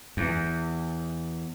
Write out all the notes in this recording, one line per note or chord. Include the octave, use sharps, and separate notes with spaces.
E2